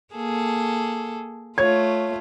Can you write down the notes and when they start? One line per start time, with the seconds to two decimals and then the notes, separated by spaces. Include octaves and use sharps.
0.14 A#3 G#4 A4
1.58 A3 F4 C#5 G#6